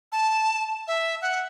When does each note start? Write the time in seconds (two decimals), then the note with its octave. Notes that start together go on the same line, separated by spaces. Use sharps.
0.12 A5
0.87 E5
1.22 F#5